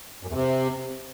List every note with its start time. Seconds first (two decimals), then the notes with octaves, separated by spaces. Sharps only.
0.23 F#2
0.29 E2
0.34 C3